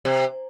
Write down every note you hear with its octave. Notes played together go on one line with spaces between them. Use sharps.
C3